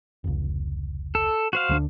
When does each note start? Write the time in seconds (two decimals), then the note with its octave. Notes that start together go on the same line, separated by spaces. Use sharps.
0.24 F1 C#2
1.15 A4
1.53 F#4 C5 F5
1.69 D2 G3 D4